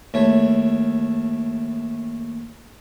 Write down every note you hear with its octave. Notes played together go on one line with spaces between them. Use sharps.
D#2 A3 C#5